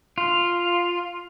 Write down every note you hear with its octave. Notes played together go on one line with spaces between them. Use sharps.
F4